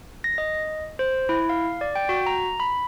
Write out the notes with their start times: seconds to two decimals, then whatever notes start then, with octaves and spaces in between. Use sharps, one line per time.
0.24 A#6
0.38 D#5
0.99 C5
1.29 E4
1.49 F5
1.81 D5
1.96 G5
2.09 F#4
2.26 A#5
2.60 B5